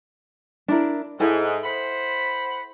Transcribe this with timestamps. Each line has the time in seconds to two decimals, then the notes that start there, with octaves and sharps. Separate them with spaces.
0.68 D4 E4 A#4
1.20 G#2 E4 A4 G#5
1.64 C5 F#5 B5